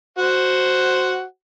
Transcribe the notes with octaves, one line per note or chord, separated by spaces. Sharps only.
F#4 C5 F#5